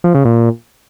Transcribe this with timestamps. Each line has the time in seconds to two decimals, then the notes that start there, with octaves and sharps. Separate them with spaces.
0.04 F3
0.14 C#3
0.25 A#2